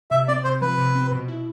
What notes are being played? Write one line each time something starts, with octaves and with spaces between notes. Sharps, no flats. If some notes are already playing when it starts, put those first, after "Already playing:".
C3 E5
C4 D5
C3 C5
F3 B4
C3
C4
B2
E4